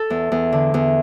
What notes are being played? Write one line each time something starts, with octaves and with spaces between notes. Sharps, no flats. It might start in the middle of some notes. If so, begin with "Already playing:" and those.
Already playing: A4
E2
E2
D3
E2